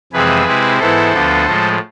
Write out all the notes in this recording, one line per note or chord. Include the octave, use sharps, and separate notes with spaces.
F2 C3 E3 G#3 C4 G#4 B4
C3 G#3 C4 E4
G#2 E3 B3 E4 A4 C5
D2 D3 F3 B3
A2 F3 G#3